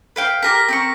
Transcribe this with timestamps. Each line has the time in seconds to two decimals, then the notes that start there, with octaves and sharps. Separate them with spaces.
0.16 B4 F5 G5
0.43 G4 G#4 A#4 A#6 B6
0.68 C4 A#4 C#6